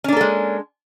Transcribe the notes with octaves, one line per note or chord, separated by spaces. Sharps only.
G#3 A#3 C#4 D4 A4